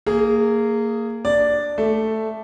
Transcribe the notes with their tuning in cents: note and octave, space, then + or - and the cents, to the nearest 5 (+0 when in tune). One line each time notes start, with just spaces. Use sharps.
A#3 -20 G#4 +0
D4 +0 D5 +0
A3 +0 E5 +0